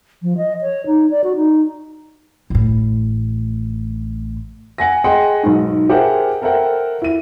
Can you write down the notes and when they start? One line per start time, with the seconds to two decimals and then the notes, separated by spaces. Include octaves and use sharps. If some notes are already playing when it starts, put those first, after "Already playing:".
0.23 F3
0.38 D#5
0.61 C#5
0.86 D#4
1.10 D5
1.24 F#4
1.36 D#4
2.50 A1 A2
4.78 F#5 G#5 A#6
5.04 G#4 D#5 F#5 G5 C6
5.43 B1 G#2
5.89 G4 G#4 A#4 C5 E5 F#5
6.42 A4 A#4 C5 E5 F#5 G5
7.02 E4 D#7